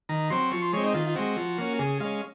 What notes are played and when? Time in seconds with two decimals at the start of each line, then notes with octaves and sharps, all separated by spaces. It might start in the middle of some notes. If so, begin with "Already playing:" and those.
0.09 D#3 A#5
0.30 F#3 C4 C6
0.52 F3 C#6
0.62 C6
0.73 G#3 C4 C#5
0.84 D#4
0.94 D#3 F4
1.07 F4
1.15 G#3 C4 F#4
1.37 F3
1.58 A#3 C#4
1.79 C#3 G#4
2.00 G#3 C#4 F5